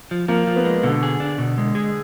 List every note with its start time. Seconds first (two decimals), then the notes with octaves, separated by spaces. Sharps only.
0.11 F3
0.28 F3 A#3
0.47 F3
0.56 B3
0.65 G#3
0.83 B2 D3
1.03 G#4
1.20 D4
1.38 B2
1.58 G#3
1.75 G#4